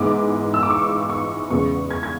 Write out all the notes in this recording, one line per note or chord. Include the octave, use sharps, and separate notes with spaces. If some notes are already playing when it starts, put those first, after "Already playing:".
Already playing: G#2 E3 G#3 B3 D6
E6
D6
C#6
C#6
E2 C#3 G#3 B3 C#6
G#6
G#6